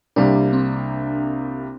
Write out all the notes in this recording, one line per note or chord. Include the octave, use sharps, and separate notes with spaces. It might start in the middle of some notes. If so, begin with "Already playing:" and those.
C2 C3 G3 A#3 D4
C4